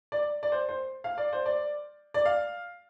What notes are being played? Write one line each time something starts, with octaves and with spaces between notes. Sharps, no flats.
D5
D5
C5
C5
F5
D5
C5
D5
D5
F5